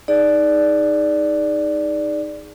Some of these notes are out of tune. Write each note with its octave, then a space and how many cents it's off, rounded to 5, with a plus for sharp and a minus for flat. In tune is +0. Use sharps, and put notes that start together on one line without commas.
D#4 +0 G#4 +0 D5 +0